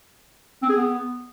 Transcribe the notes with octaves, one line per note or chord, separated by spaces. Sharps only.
C4
G#4
B3